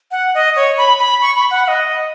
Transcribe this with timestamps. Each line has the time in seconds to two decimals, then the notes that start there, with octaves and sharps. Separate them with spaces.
0.11 F#5
0.34 D#5
0.56 C#5
0.78 B5
0.99 B5
1.22 C#6
1.36 B5
1.51 F#5
1.65 F#5
1.68 D#5